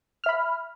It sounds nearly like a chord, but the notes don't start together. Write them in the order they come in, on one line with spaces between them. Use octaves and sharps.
F6 E5 B5